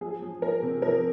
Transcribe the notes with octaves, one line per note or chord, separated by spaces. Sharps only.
F3 G#4
F3
F3 A#4
C3
F3 A#4